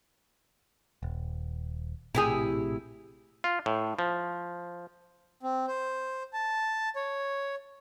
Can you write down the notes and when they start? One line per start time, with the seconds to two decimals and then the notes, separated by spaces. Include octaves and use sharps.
1.03 D#1
2.15 A#1 A2 C3 E4 G4 G#4
3.44 F4
3.66 A2
3.99 F3
5.43 C4
5.67 C5
6.33 A5
6.96 C#5